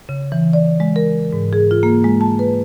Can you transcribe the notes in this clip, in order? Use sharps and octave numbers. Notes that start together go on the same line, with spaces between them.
C#3
E3
D5
G#3
A#4
G#2
G#4
F4
A#3
G#3
A5
B4